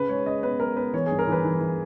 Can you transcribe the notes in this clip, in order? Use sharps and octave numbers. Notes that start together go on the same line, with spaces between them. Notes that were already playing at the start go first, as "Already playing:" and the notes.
Already playing: C#3 B4
G#3 C#5
C#3 D#5
B3 B4
G#3 A#4
B3 B4
E3 C#5
G2 G#4
A#4
E3 B4
E3
E3